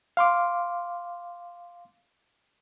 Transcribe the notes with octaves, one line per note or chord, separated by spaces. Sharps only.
F5 C6 D6